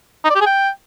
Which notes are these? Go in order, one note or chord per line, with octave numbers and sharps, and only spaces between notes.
D#4
D5
G4
G#4
G5